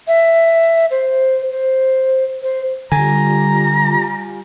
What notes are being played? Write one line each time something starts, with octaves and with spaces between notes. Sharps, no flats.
E5
C5
C5
C5
D3 G3 F4 G4 G#5 A#5